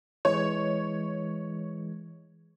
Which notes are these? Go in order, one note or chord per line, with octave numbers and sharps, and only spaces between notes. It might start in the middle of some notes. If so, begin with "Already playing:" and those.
E3 G#3 C#5